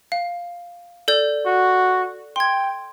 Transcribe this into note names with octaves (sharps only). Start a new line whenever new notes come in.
F5
A4 D5 G6
F#4
G5 C6 G#6